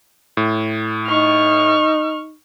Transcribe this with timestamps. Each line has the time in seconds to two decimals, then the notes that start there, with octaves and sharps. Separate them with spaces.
0.37 A2
1.06 D#4 C#6 F6